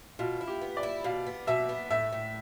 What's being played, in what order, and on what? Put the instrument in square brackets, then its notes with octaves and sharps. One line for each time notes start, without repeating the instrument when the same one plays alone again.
[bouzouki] B2 [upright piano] F4
[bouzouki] E4
[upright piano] G4
[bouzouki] B3
[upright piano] D5
[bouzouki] E4
[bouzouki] B2 [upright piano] F5
[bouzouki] B3
[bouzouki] B2 [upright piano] E5
[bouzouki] B3
[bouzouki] A2 [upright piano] E5
[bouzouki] A2